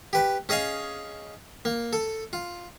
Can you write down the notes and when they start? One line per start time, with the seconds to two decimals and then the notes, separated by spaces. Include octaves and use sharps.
0.13 G4 B4
0.49 C#4 G#4 D#5 F5 G#5
1.65 A#3
1.93 A4
2.33 F4